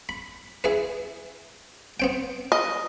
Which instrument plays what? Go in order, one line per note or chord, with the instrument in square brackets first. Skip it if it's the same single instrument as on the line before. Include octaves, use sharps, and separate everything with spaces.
[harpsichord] B5
E4 G#4 B4
B3 C4 G5
[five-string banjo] D#5